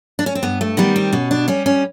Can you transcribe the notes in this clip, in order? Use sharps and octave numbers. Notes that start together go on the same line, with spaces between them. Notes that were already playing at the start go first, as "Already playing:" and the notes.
D4
C#4
C4
G2 B3
A3
D#3 G3 B3
C4
B2 C#4
D4
G3 C#4
C#4